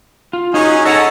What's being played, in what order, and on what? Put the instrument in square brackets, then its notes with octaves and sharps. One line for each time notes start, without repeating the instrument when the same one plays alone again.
[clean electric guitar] F4
[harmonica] F#3 C#4 G#4 [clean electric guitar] D#4
[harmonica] C#4 G#4 A4 [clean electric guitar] D#5 F#5 A#5